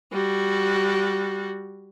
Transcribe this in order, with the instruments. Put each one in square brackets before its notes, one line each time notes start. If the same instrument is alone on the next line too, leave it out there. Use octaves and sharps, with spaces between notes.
[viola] G3 F#4